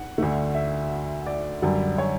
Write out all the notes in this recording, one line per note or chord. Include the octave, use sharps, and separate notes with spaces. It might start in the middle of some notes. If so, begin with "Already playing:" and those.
Already playing: F#5
D2 D3 A3
E5
D5
F#2 D3 G3
C#5